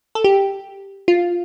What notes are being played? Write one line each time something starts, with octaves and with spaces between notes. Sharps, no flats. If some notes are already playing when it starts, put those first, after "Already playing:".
A4
G4
F4